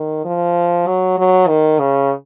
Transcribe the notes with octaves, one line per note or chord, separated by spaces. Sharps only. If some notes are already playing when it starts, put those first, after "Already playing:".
Already playing: D#3
F3
F#3
F#3
D#3
C#3